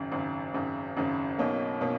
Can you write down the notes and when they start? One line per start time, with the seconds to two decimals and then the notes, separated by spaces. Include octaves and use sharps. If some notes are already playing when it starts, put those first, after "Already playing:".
Already playing: G#1 F#2 C#3
0.12 G#1 F#2 C#3
0.54 G#1 F#2 C#3
0.97 G#1 F#2 C#3
1.38 B1 B2 A#3 C#4
1.81 B2 A#3 C#4